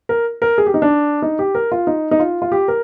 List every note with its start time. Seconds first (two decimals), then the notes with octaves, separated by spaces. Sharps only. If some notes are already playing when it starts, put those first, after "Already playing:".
0.09 A#4
0.42 A#4
0.58 G#4
0.66 G4
0.74 D#4
0.82 D4
1.22 D#4
1.39 G4
1.55 A#4
1.72 F4
1.87 D#4
2.11 D#4
2.20 F4
2.42 F4
2.52 G4
2.68 A#4